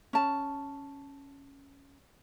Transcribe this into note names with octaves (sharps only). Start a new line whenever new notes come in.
C#4 A5